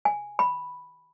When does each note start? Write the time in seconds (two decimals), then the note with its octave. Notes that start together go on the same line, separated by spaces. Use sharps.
0.05 G#5
0.39 B5